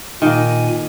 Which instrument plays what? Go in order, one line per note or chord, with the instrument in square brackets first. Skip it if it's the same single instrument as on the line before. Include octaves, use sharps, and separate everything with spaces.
[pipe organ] A#2 G#5 [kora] D#3 A#3